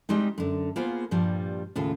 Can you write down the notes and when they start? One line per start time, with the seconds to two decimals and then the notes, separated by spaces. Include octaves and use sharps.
0.09 G3 G#3 C4 D#4
0.38 F#2 D3
0.76 A#3 B3 F4 G#4 C5
1.11 G2 A#2 F3 G3
1.76 D#2 A2 C#3 F4